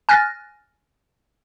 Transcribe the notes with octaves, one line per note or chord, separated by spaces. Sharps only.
G#5 F6 F#6 A6 A#6